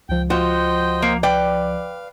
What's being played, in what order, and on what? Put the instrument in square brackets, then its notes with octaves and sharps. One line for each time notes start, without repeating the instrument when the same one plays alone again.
[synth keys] C#2 F3 [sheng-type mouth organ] G5
[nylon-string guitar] F4 [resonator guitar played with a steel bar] F#4 [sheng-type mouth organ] C5 D#5 G5
[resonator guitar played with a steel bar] A#3
[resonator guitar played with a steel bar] B4 D5 [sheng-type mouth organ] F5 [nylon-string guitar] G5